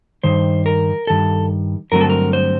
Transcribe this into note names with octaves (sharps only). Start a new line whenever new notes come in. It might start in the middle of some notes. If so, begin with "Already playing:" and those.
G2 D#3 C5
A#4
G2 D#3 A4
G2 D3 F#3 A3 C4 A#4
A4
A#4
C5